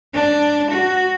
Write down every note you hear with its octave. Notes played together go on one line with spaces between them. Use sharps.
D4
F#4